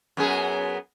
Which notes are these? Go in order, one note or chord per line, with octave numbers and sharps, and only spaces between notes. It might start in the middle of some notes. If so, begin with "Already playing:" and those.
F#2 B3 G#4